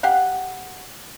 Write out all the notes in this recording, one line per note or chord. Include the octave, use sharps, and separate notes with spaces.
G4 F5 F#5